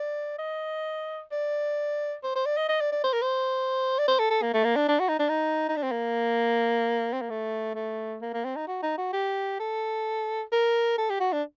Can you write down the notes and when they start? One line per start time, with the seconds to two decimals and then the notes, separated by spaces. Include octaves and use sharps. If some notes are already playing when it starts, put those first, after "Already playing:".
Already playing: D5
0.38 D#5
1.32 D5
2.24 C5
2.35 C5
2.46 D5
2.57 D#5
2.69 D#5
2.81 D5
2.92 D5
3.04 C5
3.13 A#4
3.22 C5
3.99 D5
4.08 C5
4.19 A4
4.30 A4
4.42 A#3
4.54 A3
4.64 A#3
4.76 D4
4.88 D4
5.00 F#4
5.09 D#4
5.19 D4
5.29 D#4
5.69 D#4
5.76 D4
5.83 C4
5.91 A#3
7.13 C4
7.21 A#3
7.30 A3
7.75 A3
8.22 A#3
8.34 A#3
8.45 C4
8.56 D#4
8.68 F#4
8.83 D#4
8.98 F#4
9.13 G4
9.59 A4
10.52 A#4
10.98 A4
11.10 G4
11.20 F#4
11.33 D4